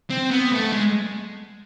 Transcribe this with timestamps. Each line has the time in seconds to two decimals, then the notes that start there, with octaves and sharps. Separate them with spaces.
0.10 C4
0.31 B3
0.52 A3
0.72 G#3